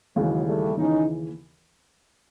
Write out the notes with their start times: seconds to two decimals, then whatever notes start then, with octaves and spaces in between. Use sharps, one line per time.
0.16 D#2 C#3 E3 F#3 G#3
0.47 G3 A3
0.77 D#2 C#3 E3 C#4 D#4